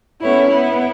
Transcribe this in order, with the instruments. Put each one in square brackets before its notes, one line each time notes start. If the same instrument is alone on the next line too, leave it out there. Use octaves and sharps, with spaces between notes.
[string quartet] B3 E4 [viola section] C#4 A4 C#5
[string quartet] B3 E4